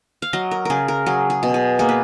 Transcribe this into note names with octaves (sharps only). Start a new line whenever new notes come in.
F5
F#3 D#5
A#4
C#3 G#4 A#4
A#4
F#3 G#4
G#4
B2
G#4
A#3 G#4
B4